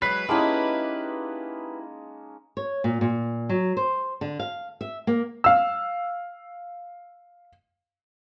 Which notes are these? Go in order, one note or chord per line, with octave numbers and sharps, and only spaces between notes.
F#3 G#3 B4 F#6 B6 C7
G#3 A#3 C#4 D#4 E4 G4 D#5 A5
C#5
A#2
A#2
F#3
C5
D3
F5
E5
A#3
F5 E6